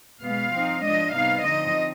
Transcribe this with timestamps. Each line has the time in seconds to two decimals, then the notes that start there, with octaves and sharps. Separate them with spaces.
0.22 B2 G#3 B3 F5
0.53 F3 C4 D#4
0.83 F3 G#3 D4 D#5
1.13 C3 G3 B3 D#4 F5
1.44 D3 F3 C4 D#4 D#5